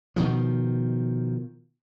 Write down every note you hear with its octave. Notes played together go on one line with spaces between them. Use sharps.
B2 D#3 F3